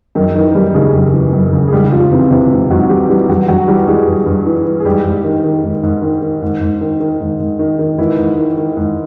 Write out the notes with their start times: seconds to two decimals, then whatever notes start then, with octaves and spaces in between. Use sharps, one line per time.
0.15 F#2 D#3 D#4
0.35 D#3 E3 D#4
0.55 F#2 G3 G4
0.74 C#3 G#3 G#4
0.94 F#2
1.14 E3
1.33 F#2
1.53 C#3
1.68 G#4
1.72 G#2 G3 G4
1.92 G#2 F3 F4
2.11 C3 E3 C4
2.31 C3 E3 C4
2.50 G#2
2.70 G#2 F#3 F#4
2.89 E3 G3 G4
3.09 E3 G3 G4
3.29 G2 F#3 F#4
3.48 G2 F#3 F#4
3.68 E3 G3 G4
3.87 E3 G#3 G#4
4.07 G2
4.26 G2
4.46 E3
4.65 E3
4.80 G#4
4.85 G#2 G3 G4
5.05 G#2
5.24 D#3
5.44 D#3
5.64 G#2
5.83 G#2
6.02 D#3
6.22 D#3
6.42 G#2
6.61 G#2
6.81 D#3
7.00 D#3
7.21 G#2
7.40 G#2
7.59 D#3
7.79 D#3
7.98 G#2 E3 E4
8.18 G#2
8.38 D#3
8.57 D#3
8.77 G#2